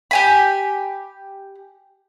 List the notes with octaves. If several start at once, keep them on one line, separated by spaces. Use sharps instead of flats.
G4 G#5 B5